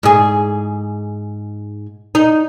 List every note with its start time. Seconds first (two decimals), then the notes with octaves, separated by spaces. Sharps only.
0.03 G#2 G#4
2.15 D#4